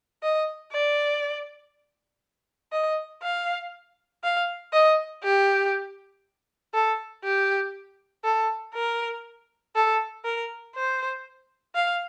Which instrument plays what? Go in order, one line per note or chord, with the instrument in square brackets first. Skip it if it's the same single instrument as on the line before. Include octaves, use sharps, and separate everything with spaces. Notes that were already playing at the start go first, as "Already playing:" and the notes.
[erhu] D#5
D5
D#5
F5
F5
D#5
G4
A4
G4
A4
A#4
A4
A#4
C5
F5